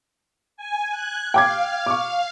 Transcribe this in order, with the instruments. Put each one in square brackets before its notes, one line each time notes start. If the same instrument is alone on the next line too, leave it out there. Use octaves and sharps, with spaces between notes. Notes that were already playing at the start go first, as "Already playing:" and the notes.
[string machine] G#5
F#6 G#6
[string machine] F5 [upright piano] G5 D6 G#6
[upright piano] C#6 D6